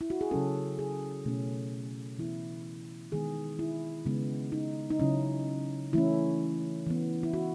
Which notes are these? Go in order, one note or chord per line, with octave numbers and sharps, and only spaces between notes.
E4
F#4
G#4
C#3 F#3 C#4 A4
G#4
B2 A3 C#4
E3 B3 E4
D#3 G#3 B3 G#4
E4
C#3 G#3 B3
D#4
D#4
C#3 F#3 C#4 E4
E3 A3 C#4 E4
E3 B3
E4
F#4